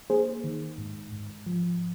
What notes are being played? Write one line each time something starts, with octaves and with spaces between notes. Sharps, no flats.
A#3 G#4 C5
D#3
G#2
G#2
F3